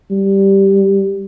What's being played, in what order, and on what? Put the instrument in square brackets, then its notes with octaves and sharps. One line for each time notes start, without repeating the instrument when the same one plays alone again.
[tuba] G3